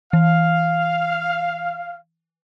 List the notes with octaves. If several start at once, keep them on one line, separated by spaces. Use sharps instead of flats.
E3 F5